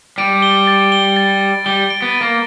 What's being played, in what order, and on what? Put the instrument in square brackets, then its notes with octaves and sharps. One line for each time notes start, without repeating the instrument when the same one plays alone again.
[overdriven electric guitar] G3 [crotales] D7
[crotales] G7
A6
G7
A6
A6
[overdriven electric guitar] G3 [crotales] G7
[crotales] D7
[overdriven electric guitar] B3
[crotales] D7
[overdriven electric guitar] A#3